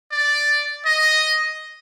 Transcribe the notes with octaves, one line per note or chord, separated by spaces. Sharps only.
D5
D#5